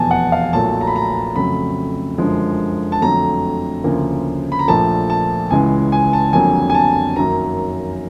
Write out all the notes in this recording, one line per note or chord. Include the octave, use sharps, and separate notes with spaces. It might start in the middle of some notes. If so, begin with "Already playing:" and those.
Already playing: F1 E2 B2 G#5 A5
F#5
F5
B1 A#2 F#3 A3 A5
A#5
B5
A#5
F2 C#3 F#3 A3 B5
F#2 D3 F3 G#3
A5
F2 D3 F#3 A3 A#5
D2 C#3 F3 A#3
B5
A#5
A#1 A#2 F3 A3 A5
A5
C#2 C#3 E3 G#3 G#5
G#5
A5
F1 F2 D3 F#3 A#3 G#5
G#5
A5
F#2 D#3 F#3 A#3 A#5